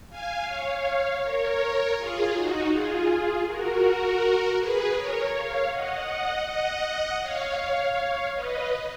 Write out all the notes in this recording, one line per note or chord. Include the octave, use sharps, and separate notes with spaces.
F5 G#5
C#5 F5
A#4 C#5
F4 G#4
D#4 F#4
F4 G#4
F#4 A#4
G#4 B4
A#4 C#5
C#5 F5
D#5 F#5
D#5 F#5
C#5 F5
C#5 F5
B4 D#5